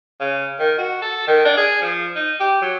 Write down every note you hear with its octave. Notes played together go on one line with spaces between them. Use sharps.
C#3
D#3
F#4
A4
D#3
D4
G#4
F3
D#4
G4
F#3